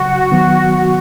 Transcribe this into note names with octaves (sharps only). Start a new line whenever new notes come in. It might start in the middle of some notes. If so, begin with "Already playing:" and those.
Already playing: C#3 F#3 F#4
D#3 F#3 B3